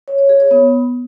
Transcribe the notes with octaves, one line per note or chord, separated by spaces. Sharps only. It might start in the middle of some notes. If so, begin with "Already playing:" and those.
C#5
C#5
G#4
C#5
B3